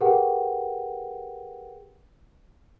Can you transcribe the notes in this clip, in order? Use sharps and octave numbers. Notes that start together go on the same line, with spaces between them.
G4 G#4 A#4 B4 F#5 G5